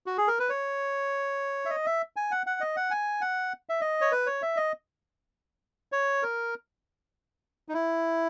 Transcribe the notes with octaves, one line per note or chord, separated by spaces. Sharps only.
F#4
G#4
A#4
B4
C#5
E5
D#5
E5
G#5
F#5
F#5
D#5
F#5
G#5
F#5
E5
D#5
C#5
B4
C#5
E5
D#5
C#5
A#4
D#4
E4